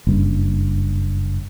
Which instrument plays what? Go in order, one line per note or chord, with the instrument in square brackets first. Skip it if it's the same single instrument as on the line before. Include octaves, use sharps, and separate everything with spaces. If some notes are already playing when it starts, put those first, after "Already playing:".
[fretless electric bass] F#1 G2